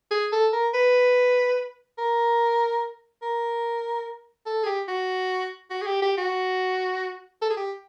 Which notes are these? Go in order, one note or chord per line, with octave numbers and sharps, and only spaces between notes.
G#4
A4
A#4
B4
A#4
A#4
A4
G#4
G4
F#4
F#4
G#4
G4
G4
F#4
A4
G#4
G4